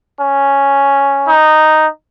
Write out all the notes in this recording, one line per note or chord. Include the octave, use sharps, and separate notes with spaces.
C#4
D#4